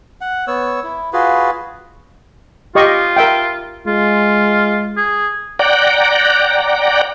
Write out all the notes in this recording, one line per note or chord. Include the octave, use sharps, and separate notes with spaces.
F#5
B3 C#5 E6
E4
F4 F#4 G#4 B4
F4 G4 D#5 C#6
A#4 E5 G5
G#3 F4
G#4
D5 F#5 G5 A#5